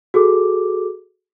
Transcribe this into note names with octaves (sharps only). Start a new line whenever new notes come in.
F#4 G#4 A4 D6